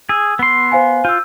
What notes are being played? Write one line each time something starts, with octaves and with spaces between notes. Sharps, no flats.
G#4 E6
B3 C6
C5 F5 G#5
F4 E6 G6